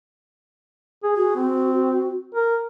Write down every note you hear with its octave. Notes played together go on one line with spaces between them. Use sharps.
G#4
F#4 G#4
C4
A#4